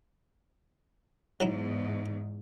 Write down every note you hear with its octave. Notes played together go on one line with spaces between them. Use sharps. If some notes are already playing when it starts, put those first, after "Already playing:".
E2 G#2 F#3 D#4 E4